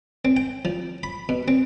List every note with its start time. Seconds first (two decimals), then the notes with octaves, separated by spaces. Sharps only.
0.25 C4
0.37 G5
0.65 F3
1.03 B5
1.29 B2
1.48 C4